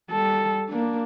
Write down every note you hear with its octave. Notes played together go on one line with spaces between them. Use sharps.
G3 A4
A#3 D4